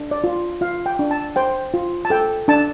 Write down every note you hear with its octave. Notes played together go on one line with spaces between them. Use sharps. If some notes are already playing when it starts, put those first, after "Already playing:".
Already playing: D4
D5
F4
F4 F5
G5
D4
A5
C5 G5
F4
A5
A4 G5
D4 A5